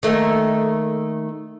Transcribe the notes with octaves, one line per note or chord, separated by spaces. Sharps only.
D#3 A3 A#3